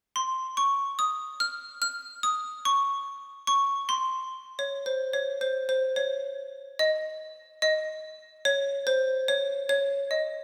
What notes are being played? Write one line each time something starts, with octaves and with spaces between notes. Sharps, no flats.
C6
C#6
D#6
F6
F6
D#6
C#6
C#6
C6
C#5
C5
C#5
C5
C5
C#5
D#5
D#5
C#5
C5
C#5
C#5
D#5